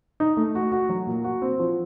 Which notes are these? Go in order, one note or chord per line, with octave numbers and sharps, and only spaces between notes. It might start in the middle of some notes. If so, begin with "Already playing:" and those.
D#4
A3
F#4
F#4
F#3
A#2
F#4
C4
F3